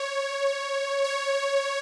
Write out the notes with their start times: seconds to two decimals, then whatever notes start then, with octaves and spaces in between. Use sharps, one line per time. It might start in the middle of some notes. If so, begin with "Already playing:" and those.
Already playing: C#5
1.04 C#5